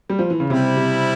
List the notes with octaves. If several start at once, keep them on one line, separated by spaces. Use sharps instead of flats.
G3
F3
E3
C#3
C3 G3 C4 E4
C3